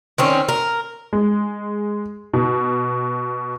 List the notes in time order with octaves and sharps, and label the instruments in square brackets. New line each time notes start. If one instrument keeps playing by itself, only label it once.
[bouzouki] D#3 C4 C#4
A#4
[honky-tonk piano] G#3
B2